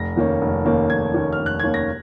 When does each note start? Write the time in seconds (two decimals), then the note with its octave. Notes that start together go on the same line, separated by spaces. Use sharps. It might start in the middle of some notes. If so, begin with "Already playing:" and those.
Already playing: F1 A#6
0.16 D#2 D#3 A#3 C#4
0.41 F1
0.65 D#2 D#3 A#3 C#4
0.90 F1 G#6
1.14 D#2 D#3 A#3 C#4
1.33 F6
1.39 F1
1.46 F#6
1.60 D#2 D#3 A#3 C#4 G#6
1.74 A#6